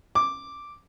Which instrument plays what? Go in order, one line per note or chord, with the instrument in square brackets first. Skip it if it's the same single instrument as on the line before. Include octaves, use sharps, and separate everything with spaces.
[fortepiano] D6